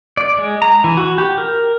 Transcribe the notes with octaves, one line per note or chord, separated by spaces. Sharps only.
D5
G#3
A#5
E3
F#4
G4
A#4